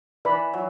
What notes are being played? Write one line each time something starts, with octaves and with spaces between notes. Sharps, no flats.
E3 B4 D5 B5
F#3